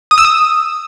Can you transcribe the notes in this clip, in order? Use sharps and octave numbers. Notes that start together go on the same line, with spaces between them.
D#6
E6
D#6